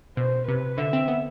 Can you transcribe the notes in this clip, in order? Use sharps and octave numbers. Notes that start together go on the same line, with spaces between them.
B2 C5
C3 B4
D3 E5
C4
B3